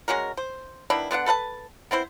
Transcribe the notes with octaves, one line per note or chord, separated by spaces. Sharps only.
G#3 C#4 F#4 A#4
C5
D#3 B3 D4 E4
D3 B3 D4 F#5
A4 B4 F#5 A5
B3 C4 E4 C5